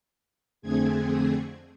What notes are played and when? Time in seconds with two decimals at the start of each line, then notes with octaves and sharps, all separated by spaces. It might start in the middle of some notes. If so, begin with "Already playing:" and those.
0.62 F2 D3 A3 C4 G#4 G#6